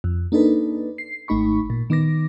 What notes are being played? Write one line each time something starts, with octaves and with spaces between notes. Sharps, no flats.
F2
A#3 D4 D#4 A4 B4
C7
G#1 A3 D#4 B5 C#6
A#2
D#3 B3 D6 A#6